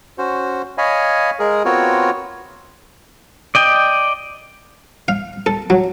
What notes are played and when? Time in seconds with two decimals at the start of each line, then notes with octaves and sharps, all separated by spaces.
0.18 C#4 F#4 C5
0.78 C#5 D#5 F5 G#5 B5
1.39 G#3 G#4 A#4
1.65 B3 C4 F4 F#4 A#4 C#5
3.55 D5 D#5 G5
5.08 F5
5.46 A4
5.70 F#3